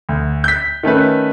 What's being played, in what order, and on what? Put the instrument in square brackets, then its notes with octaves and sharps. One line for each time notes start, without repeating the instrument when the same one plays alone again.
[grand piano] D2
G6 B6
D#3 A3 C#4 B4